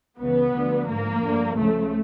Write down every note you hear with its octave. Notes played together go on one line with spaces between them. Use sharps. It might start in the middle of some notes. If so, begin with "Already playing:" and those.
C#2 C#3 E3 B3
D2 D3 F3
G#2 F3 A#3
G2 D3 F3
C#2 C#3 F3 A3